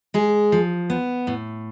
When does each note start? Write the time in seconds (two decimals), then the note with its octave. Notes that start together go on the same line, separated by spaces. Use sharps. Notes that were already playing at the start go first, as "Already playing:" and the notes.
0.14 G#3 G#4
0.52 F3
0.90 B3
1.27 A2